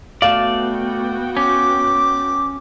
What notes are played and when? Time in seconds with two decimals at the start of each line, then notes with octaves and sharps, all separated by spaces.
0.22 A3 B3 F#4 D5 F5 G5
1.37 C#4 D6